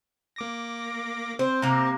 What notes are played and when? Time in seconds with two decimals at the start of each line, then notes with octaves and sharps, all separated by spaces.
0.36 A#3 D6 A#6
1.39 C4 C5
1.62 C3 A#3